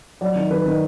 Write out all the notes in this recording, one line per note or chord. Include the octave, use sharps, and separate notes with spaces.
F#3 D5
D#3
D#3 B4
D#3